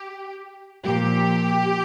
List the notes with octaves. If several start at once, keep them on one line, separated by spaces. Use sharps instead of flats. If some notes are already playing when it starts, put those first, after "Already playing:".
Already playing: G4
A#2 F3 G4